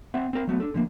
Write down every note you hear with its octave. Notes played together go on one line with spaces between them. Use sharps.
C4 E5 F#5
C4 A#4
F#3 A3 B3
D4 A4
D3 F3 F#3 A#3